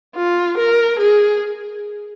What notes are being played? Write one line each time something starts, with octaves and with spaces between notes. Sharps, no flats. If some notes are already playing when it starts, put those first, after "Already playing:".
F4
A#4
G#4